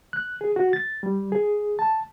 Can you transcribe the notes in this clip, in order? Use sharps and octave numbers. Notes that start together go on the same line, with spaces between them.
F#6
G#4
F#4
A6
G3
G#4
A5